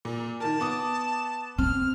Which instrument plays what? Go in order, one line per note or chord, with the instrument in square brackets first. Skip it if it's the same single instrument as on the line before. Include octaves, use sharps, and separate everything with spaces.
[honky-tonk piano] A#2
[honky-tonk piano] D#3 A#4 [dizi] A5
[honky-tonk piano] B3 D6 D#6
[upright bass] C4 [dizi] F6